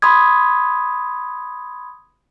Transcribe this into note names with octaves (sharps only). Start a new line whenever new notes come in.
B5 C6 D#6 G#6